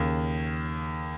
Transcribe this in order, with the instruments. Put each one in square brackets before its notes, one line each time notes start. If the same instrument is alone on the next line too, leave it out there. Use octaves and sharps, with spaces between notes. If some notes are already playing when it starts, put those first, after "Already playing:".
Already playing: [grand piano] D#2 C#3 A#3